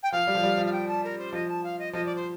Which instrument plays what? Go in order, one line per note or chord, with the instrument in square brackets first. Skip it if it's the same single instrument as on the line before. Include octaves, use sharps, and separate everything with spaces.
[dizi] G5
[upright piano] F3 [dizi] F5
[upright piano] G3
F3
G3
F3
[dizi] F5
G5
A5
A#4
C5
[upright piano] F3 [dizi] D#5
[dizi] A5
F5
D#5
[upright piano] F3 [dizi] D#5
[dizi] D5
C5